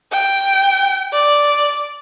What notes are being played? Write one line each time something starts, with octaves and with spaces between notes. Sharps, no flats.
G5
D5